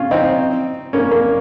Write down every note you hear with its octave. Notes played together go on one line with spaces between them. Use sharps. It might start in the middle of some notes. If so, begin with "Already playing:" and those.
Already playing: C#4 F4
C4 D#4
A#3 C#4
A#3